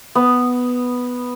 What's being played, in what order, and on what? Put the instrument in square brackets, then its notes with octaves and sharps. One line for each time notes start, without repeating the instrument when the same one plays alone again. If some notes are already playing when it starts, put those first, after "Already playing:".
[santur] B3